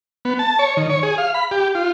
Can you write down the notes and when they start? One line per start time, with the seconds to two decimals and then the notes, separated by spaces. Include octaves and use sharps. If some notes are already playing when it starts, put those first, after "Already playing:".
0.25 B3
0.39 A5
0.59 C#5
0.77 D#3
0.90 C#5
1.03 G#4
1.18 F5
1.35 B5
1.51 G4
1.75 F4